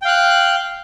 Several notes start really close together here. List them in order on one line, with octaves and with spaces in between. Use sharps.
G5 F5 F#6